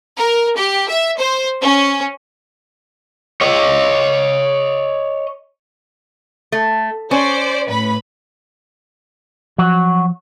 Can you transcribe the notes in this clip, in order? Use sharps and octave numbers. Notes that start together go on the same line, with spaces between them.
A#4
G4
E5
C5
C#4
C#5 D#5
A3
C#4 C5 D5
A2 B4 B5
F3 F#3 F#4